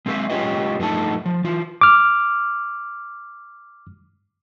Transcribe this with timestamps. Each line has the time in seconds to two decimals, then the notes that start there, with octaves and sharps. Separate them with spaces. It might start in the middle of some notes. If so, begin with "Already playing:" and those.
0.06 G#3 C4 E4 A4 E5 F5
0.30 G#3 C#4 F4 G4 B4 D#5
0.79 G2 F3 A3 D#4 A5
1.26 F3
1.44 E3 F4
1.81 D6 F6